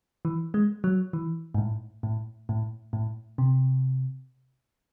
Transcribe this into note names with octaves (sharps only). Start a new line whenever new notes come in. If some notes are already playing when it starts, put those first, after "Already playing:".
E3
G#3
F#3
E3
G#2
A2
A2
A2
A2
C3